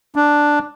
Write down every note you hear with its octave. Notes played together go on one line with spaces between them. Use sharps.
D4